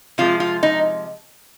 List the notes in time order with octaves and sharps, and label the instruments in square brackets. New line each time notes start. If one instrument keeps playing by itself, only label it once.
[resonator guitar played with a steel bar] C3 F3 G#3 F4
F4
D#4